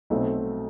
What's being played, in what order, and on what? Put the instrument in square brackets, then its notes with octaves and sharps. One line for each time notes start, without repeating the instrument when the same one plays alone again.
[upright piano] B1 B2 A3 C4